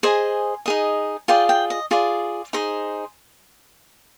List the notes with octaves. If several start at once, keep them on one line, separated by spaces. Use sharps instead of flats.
G#4 C5 D#5 G#5
D#4 G#4 D#5
F4 G#4 D5 G5
G5
D#5
F4 G#4 D5
D#4 G#4 C5